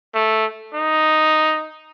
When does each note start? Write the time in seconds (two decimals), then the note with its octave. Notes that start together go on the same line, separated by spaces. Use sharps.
0.14 A3
0.74 D#4